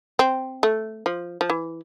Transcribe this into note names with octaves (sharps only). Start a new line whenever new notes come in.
C4
A3
F3
F3
E3